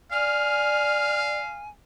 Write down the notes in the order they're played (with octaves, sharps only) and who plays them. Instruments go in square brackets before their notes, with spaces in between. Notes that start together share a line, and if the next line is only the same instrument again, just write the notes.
[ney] D5 [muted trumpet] F5 [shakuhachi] G#5 [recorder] F6